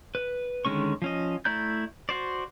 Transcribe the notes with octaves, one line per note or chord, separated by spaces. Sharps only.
B4
D3 D#3 G#3 C#4 C#6
F3 C#4 D#5
A3 E4 D5 A#5 G6
F#4 C5 D5